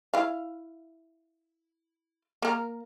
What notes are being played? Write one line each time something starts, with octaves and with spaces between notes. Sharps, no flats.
E4 F5
A#3 A#4